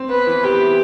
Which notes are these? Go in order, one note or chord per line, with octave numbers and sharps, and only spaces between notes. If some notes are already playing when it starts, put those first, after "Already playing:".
Already playing: C4
B3 B4
E3
B3 G4
E4